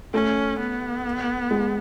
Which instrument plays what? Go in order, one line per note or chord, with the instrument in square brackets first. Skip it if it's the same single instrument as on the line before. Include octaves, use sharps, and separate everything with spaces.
[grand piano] A3 [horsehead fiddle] C#4
[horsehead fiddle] B3
[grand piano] G#3